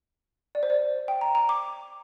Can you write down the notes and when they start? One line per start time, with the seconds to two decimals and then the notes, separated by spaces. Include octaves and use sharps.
0.55 D5
0.63 C5
0.70 D5
1.08 G5
1.21 A#5
1.35 A#5
1.49 D6